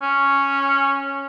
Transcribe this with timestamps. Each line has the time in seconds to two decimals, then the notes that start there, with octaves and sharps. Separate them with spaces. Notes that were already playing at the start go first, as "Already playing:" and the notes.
0.02 C#4